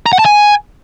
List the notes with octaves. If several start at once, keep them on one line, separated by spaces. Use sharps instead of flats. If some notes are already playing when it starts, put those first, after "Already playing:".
A#5
F#5
A5
G#5